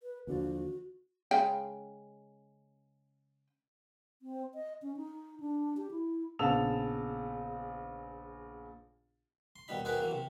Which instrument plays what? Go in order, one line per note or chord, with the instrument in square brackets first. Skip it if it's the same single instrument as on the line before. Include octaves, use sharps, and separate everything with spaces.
[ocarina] B4
[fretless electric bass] D#2 D3 F3 [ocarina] F#4
[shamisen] C#3 G#3 G5
[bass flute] C4
D#5
C#4
D#4
D4
G4
E4
[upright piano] A#1 C#3 B3 A5 E6 F7
[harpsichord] C6
D#2 B2 G3 D#4 B5
C4 D#4 F#4 G#4 A#4 B4
E3 F#3 A#3
C3